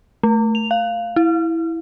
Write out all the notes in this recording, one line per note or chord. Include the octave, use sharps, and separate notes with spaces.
A3
F7
F5
E4